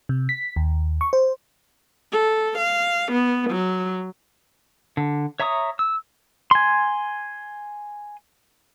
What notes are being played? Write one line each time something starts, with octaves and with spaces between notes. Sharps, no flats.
C3
B6
D#2
C#6
C5
A4
F5
B3
F#3
D3
C#5 E5 A#5 C#6 D#6
E6
G#5 C6